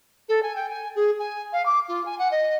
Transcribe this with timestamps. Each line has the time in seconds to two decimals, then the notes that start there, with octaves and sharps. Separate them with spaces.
0.28 A4
0.42 G#5
0.55 G5
0.69 G#5
0.95 G#4
1.19 G#5
1.52 F5
1.65 D6
1.88 F4
2.05 G#5
2.18 F#5
2.31 D#5